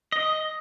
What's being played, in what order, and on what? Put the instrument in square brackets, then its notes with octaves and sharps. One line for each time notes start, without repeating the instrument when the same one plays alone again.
[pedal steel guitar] D#5